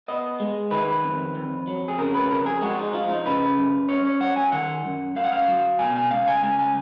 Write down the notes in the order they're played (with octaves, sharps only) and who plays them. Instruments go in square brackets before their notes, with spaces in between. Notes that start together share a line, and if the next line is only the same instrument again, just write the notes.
[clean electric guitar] B3 D#5
G#3
D#3 B4
F2
F2
F#3
G#4
C#3 A#4
B4
F2 A#4
G#4
G#3 F#4
D#4
F3 F4
D#4
C#3 B4
F#2
C#4 C#5
C#5
F#3 F#5
G#5
D#3 F#5
F#2
F#2 F5
F#5
F5
F#3
B2 G#5
G#5
C#2 F5
G#5
C#2 G#5
G#5